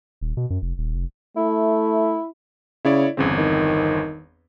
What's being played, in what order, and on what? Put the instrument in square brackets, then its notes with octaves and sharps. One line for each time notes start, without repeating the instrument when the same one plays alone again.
[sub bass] D#1
B2
F#2
F1
D#1
F1
[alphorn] A3 [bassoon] E4
[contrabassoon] C#3 [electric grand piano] E4 C#5 D5
[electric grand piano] G1 E2 C4 [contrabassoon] C#3
[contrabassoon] D#3